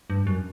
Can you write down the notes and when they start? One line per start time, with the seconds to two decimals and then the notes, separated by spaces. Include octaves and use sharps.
0.10 G2
0.27 F#2